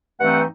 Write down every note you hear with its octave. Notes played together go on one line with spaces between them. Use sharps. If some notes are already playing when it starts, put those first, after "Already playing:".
G2 E3 A3 C4 D#4 F#5